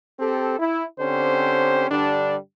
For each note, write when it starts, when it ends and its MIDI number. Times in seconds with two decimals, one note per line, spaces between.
0.20 0.58 60
0.20 0.58 67
0.20 0.58 69
0.59 0.84 64
1.00 1.87 50
1.00 1.87 60
1.00 1.87 61
1.00 1.87 67
1.00 1.87 72
1.90 2.35 43
1.90 2.35 50
1.90 2.35 55
1.90 2.35 62